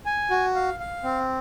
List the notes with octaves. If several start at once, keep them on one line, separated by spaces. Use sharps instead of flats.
G#5
F#4
F5
F5
C4